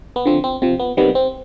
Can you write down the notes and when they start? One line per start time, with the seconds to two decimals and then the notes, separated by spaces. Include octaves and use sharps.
0.16 B3
0.26 D3 F3 C4
0.44 C4
0.62 C3 F3 C4
0.79 B3
0.97 C3 D#3 G3 B3
1.15 C4